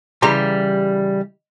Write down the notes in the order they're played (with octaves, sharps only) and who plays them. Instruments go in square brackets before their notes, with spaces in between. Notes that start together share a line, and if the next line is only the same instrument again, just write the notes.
[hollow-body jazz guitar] C#3 E3 G3 G4 A#5 C6